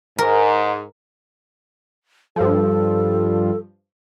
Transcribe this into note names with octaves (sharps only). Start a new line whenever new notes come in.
G#2 A#4
G2 F3 A4